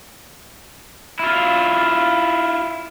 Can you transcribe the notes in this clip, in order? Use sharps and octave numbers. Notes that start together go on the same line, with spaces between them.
E4 F4